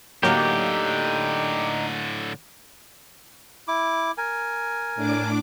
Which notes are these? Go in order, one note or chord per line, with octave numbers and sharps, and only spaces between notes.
A2 D3 F#3 A#3 D#4 G4
E4 D6
A#4 G#5
A2 D4 D6